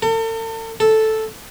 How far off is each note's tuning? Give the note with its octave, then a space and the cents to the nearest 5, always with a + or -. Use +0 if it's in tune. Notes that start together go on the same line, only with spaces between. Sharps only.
A4 +40
A4 -5